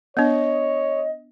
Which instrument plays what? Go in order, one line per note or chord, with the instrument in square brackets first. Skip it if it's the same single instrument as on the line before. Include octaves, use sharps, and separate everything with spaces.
[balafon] B3 D4 [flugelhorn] C#5 [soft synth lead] D#5